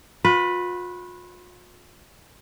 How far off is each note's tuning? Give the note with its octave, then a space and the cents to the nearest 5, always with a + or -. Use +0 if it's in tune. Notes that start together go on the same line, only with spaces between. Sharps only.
F4 +45 B4 +0